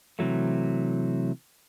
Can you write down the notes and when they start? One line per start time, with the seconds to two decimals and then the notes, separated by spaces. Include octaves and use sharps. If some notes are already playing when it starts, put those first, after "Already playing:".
0.19 C3 E3 F#3 A3